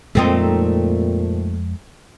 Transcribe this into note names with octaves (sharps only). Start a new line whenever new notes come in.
F2 A#2 G#3 A3 C4 D#4